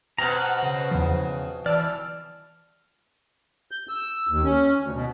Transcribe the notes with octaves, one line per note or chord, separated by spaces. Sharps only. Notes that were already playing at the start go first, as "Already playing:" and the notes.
B2 C4 F#5 A#5
C#3
E2 F3
E3 D5 A5 E6 F6
G6
E6
D#2
C#4
D2
B2